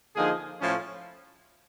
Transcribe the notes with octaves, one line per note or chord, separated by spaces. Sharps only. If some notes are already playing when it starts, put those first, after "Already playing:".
D3 F3 A#3 D#4 G#4
A2 F3 A3 C#4